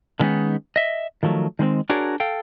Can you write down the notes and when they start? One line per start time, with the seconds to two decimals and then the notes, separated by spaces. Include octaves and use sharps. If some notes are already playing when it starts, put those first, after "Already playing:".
0.20 D3 D#3 G#3 B3 C#4 D#4
0.76 D#5 E5
1.23 D#3 F3 F#3 A3
1.59 D#3 G#3 A#3 C4
1.90 D4 F#4 G#4 A#4 C#5 D5
2.20 A4 F5 G5